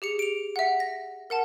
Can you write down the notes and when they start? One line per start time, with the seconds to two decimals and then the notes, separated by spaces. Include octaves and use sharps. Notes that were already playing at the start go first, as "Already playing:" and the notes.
0.02 G4 G#4 C#7
0.19 D7 F7
0.56 E5 F#5
0.80 A#6
1.30 A#4 F#5 A5